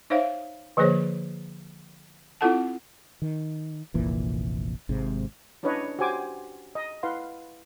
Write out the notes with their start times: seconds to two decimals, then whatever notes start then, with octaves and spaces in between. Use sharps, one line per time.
0.10 D#4 C5 C#5 E5 F5
0.77 D3 F3 A#3 G#4 C5 C#5
2.41 C4 E4 F4 A4 F#5 A5
3.22 D#3
3.94 F1 A#1 A#2 E3
4.89 G#1 G#2 C3
5.63 C#4 D4 E4 B4 C#5 D#5
5.99 F#4 G4 C5 G#5 D6
6.75 D#5
7.03 E4 B4 F5 F#5 C6